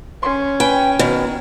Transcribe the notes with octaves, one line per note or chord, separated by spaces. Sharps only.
C#4 C6
B4 G5 G#5
B2 D#3